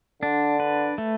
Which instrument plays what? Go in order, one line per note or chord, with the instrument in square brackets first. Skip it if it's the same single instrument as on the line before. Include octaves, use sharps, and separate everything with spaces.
[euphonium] D3 [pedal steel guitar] D4
[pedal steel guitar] B4
A3